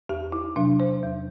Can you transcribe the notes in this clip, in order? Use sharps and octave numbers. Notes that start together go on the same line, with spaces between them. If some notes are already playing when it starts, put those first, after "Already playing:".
E2 G4
E4
C3 F#3 D4
C5
E2